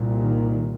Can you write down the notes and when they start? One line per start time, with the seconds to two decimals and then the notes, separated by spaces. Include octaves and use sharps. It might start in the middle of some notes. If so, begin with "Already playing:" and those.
Already playing: C2 A#2
0.20 D#3